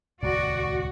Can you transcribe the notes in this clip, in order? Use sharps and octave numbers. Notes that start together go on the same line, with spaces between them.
D#1 C#2 G2 F#4 D5